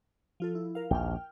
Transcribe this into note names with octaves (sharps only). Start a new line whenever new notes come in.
F3 F4 A4
E4
A#4 F5
A#1 D#2 G5 F6